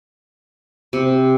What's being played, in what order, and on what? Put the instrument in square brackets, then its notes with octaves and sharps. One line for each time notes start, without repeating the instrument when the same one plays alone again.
[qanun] C3